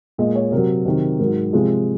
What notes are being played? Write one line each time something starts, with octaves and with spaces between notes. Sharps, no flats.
A#2 G#3 D#5
C#5
C3 A#4
F#3
C3 D#3 F#3
G#2 F#3 A#4
C3 F3 G#3